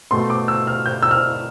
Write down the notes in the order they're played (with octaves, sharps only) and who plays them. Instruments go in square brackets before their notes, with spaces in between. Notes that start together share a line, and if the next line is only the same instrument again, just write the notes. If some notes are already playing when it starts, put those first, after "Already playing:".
[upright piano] B2 A3 C6
D6
E6
F6
G6
E6
F6